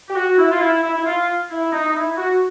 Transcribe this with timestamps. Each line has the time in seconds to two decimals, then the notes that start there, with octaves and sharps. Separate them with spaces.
0.09 G4
0.15 F#4
0.38 E4
0.52 F4
0.60 E4
0.83 E4
0.98 E4
1.05 F4
1.50 E4
1.72 D#4
1.90 D#4
1.95 E4
2.17 F#4